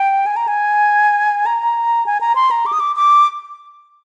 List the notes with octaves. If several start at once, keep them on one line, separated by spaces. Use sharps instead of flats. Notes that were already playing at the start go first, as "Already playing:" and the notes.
Already playing: G5
G#5
A#5
G#5
A#5
G#5
A#5
C6
A#5
D6
D#6
D6
D6